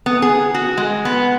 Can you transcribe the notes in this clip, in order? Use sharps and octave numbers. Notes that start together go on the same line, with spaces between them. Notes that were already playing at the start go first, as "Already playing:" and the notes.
B3
G#4
F#4
G#3
B3